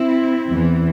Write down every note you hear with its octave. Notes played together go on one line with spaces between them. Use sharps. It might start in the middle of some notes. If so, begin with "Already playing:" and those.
Already playing: C4 E4
E2 E3